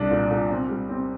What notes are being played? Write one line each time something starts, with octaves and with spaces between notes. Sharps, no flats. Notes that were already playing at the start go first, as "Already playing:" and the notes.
Already playing: C2 D4
A#2
A#2
C4
G3
C4